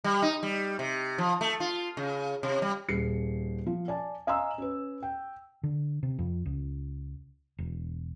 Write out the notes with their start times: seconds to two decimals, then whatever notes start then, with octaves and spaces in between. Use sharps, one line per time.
0.04 G3
0.22 D#4
0.43 G3
0.79 C3
1.18 F3
1.41 A3
1.60 F4
1.97 C#3
2.43 C3
2.62 G3
2.88 D#1 G#4 C7 C#7
3.66 F3
3.88 D5 G#5 A5
4.27 D#5 F5 G#5 A#5 C6 E6
4.58 C#4 B4
5.03 G5
5.63 D3
6.03 C3
6.19 F2
6.46 C#2
7.58 E1